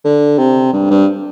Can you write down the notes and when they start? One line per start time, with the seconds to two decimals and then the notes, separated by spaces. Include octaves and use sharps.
0.05 D3
0.39 C3
0.73 G2
0.90 G2